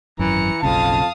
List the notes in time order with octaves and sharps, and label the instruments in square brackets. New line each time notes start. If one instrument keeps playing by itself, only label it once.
[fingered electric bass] G#1 F#2 [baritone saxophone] E3 [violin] A#5 C#7
[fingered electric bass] F#1 B1 C#3 [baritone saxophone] F2 [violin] F5 D#6 [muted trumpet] A5